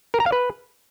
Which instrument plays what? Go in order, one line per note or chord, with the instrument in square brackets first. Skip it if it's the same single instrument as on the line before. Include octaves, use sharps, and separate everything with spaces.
[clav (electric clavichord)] A#4
A#5
F5
B4